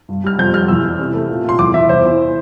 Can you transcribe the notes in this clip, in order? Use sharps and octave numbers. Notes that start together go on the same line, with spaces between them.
G2
G3 F6
F2 G6
G3 F6
E2 E6
E3
C3
A3
A#2
A#2 C6
E2 D6
E3 E5
E2 C5
E3